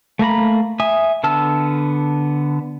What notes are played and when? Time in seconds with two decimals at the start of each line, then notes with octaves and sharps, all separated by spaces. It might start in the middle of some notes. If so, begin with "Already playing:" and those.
0.19 A3 A#3 A#5 B5
0.80 E5 G#5 D#6
1.24 D3 B3 A5 E6 F6